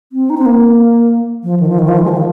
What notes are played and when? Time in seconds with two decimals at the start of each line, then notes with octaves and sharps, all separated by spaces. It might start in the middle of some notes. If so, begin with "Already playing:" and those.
0.12 C4
0.30 D#4
0.38 C4
0.46 A#3
1.43 F3
1.60 D#3
1.69 F3
1.79 D#3
1.88 F3
1.98 D#3
2.04 G#3
2.08 F3
2.16 D#3